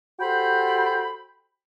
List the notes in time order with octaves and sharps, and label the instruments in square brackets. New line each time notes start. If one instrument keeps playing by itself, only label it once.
[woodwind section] F#4 G4 A4 C5 G5 B5